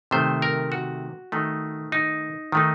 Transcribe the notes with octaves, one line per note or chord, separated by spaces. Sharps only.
C3 D#3 A3 C5
A#4
F#4
D#3 A3 D#4
D#4
D#3 A3 D#4